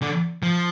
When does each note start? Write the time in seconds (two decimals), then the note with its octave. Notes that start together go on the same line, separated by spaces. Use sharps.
0.02 D3
0.43 F3